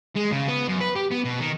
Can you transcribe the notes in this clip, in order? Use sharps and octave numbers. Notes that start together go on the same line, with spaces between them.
G#3
C#3
B3
F#2
B4
G4
B3
B2
D#3